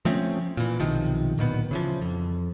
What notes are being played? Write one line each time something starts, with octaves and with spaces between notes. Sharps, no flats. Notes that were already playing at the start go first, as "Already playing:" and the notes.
F3 A3 C4 C#4
A#2 E3
B1 C3 D#3 F3
D1 A#2 D#3 B3
C#3 E3 F3
F2